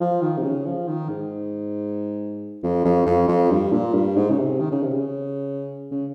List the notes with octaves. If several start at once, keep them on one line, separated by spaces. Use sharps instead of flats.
F3
D#3
C3
C#3
F3
D#3
G#2
F2
F2
F2
F2
G2
A#2
G2
G#2
C#3
C3
D#3
C#3
C3
C#3
C#3